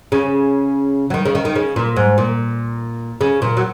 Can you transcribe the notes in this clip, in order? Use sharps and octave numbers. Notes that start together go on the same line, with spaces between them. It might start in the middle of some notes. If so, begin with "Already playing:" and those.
C#3
F#3
D#3
C#3
D#3
D#3
C#3
A#2
G#2
A#2
C#3
A#2
F#3